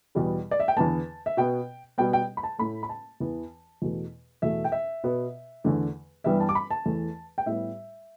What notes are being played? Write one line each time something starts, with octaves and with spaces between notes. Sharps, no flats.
E2 B2 G3 B3
D5
E5
G5
E2 D3 B3 A5
E5
B2 B3 G5
B2 G3 B3 G5
G5
B5
A5
A2 A3 B5
B5
A5
E2 E3 B3
E2 B2 A3
E2 B2 A3 E5
G5
E5
B2 B3
E2 D3 A3
G2 E3 G3 B3 E5
A5
D6
B5
A5
E2 E3 A3
G5
A2 G3 B3 E5